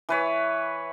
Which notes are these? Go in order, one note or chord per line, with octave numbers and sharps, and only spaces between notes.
E3 B4 C#5